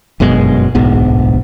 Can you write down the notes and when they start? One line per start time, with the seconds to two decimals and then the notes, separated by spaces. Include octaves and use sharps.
0.20 G1 F#2 B2 G#3
0.75 D1 B1 G#2 B3